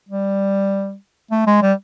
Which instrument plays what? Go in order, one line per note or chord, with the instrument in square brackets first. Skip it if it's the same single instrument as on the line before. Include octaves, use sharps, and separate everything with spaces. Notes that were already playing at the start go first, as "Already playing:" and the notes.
[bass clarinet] G3
A3
G#3
G3